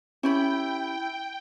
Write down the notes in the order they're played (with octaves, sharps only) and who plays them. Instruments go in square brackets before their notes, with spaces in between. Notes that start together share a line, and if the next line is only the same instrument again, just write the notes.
[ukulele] C#4 G4 B5 [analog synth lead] E4 [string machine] G5